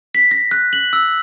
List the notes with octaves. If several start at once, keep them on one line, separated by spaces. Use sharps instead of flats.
B6
A#6
F#6
F#7
E6